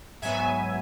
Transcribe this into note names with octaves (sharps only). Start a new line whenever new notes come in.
G#2 F#3 B3 E5 G#5